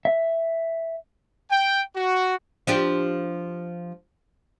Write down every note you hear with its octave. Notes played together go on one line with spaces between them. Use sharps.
E5
G5
F#4
F3 D4 G4